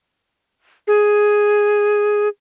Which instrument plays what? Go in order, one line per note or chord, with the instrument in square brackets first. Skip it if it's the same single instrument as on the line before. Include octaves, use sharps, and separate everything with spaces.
[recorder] G#4